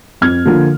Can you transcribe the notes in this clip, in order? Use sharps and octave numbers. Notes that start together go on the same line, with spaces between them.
F2 F6 G#6
D3 F3 A#3